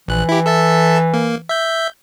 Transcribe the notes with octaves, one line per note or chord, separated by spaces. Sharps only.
A#1 E3 F#6
E4 G4
A4 E5 A5
A#3
E5 G6